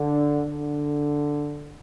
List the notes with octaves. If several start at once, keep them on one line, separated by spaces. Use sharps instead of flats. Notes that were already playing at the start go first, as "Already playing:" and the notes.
Already playing: D3
D3